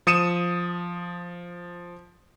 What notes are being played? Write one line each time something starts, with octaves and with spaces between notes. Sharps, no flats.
F3 D#6 C#7 D#7 E7